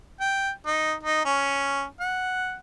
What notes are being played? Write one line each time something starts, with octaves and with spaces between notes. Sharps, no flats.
G5
D#4
D#4
C#4
F#5